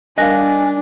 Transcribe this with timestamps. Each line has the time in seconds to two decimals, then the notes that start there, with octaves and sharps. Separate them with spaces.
0.18 G3 D4 A#4 D#5 F5 G#5 F#6